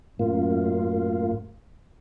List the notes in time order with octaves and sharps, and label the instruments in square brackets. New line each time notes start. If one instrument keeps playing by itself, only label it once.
[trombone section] F#2 [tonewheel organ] A2 A#3 F4